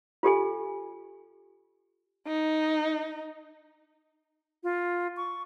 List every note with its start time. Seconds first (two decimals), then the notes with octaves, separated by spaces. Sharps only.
0.23 F4 G4 A4 G#5
2.28 D#4
4.64 F4
5.17 C#6